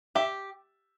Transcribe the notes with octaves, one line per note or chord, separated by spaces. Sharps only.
G4 E5